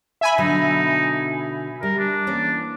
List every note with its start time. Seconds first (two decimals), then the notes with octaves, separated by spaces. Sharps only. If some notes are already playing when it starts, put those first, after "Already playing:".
0.21 E5 G#5 B5
0.38 B2 D3 F#3 D#4
1.83 G3 A#4
1.98 D4
2.27 E3 A#3 C#4